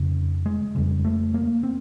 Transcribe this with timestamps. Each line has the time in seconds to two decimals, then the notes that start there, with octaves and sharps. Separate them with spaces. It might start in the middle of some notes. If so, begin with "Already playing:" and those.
Already playing: F2 C#3
0.46 G#3
0.75 F2 C#3 G3
1.04 A3
1.34 A#3
1.63 C4